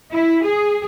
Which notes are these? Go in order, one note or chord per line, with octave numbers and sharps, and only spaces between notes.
E4
G#4